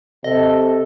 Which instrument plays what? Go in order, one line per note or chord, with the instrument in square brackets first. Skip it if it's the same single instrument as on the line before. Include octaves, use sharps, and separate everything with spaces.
[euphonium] C3 [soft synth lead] A4 [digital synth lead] D#5